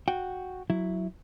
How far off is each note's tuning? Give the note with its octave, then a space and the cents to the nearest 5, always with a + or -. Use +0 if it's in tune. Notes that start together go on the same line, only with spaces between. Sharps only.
F#4 -5 G5 +0
F#3 +0 E4 +0